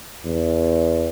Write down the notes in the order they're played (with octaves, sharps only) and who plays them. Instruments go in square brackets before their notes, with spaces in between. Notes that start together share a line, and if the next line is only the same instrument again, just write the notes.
[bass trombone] E2